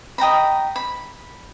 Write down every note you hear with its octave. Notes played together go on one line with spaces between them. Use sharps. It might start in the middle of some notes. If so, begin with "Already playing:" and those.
D#5 G5 A#5 B5
B5